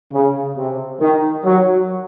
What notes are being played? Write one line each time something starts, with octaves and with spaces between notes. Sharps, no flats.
C#3
C3
D#3
F#3